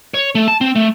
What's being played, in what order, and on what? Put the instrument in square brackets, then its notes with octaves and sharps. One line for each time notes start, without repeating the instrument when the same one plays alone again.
[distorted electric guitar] C#5
A3
A5
C4
A3